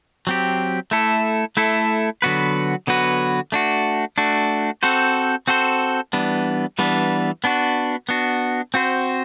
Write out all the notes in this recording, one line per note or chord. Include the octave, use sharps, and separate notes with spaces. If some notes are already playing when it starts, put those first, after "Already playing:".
F#3 C4 G4
A3 E4 A4
A3 E4 A4
D3 F#3 B3 F#4 B4
D3 F#3 B3 F#4 B4
A3 D4 F#4
A3 D4 F#4
C4 F#4 A4 C5
C4 F#4 A4 C5
E3 G3 B3 D4
E3 G3 B3 D4
B3 D4 F#4
B3 D4 F#4
C4 F#4 C5